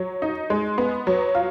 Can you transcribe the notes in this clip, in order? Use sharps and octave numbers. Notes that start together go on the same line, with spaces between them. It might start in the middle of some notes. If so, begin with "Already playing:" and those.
Already playing: F#3
D#4
G#3
B3
F#3
F4